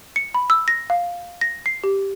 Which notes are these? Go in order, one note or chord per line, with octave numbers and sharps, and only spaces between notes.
C#7
B5
E6
A#6
F5
A#6
C7
G4